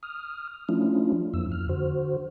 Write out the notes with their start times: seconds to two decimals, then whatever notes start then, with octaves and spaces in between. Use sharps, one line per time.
0.03 D#6 F6
0.69 F3 A3 C#4 D4 E4 F4
1.34 F2 F3 A#3 E6
1.52 F2 F6
1.69 D3 F#4 C5